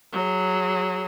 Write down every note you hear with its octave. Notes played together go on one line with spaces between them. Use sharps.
F#3 G#4